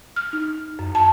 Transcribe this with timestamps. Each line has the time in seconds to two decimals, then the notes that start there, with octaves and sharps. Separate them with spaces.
0.16 F6
0.33 D#4
0.79 F#2
0.95 A5